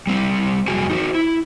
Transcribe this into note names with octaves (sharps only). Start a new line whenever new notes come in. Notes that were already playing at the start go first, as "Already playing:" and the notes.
G3 C4 C5
F2 F#3 G3 F#4 G#4 G#5
D#4 F#4 C5
E4